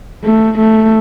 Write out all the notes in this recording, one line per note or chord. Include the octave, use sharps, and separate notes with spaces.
A3
A3